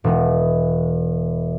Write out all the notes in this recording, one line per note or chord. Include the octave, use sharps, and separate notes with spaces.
E1 G#3